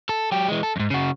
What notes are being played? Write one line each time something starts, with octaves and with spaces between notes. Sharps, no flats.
A4
F#3 G4
E3 G#3
A4
F2 G#2
C#3 F#4